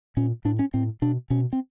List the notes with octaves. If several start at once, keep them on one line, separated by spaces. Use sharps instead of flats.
A#2 C#4
A2 D4
C#4
A2 C4
B2 D4
B2 C#4
C4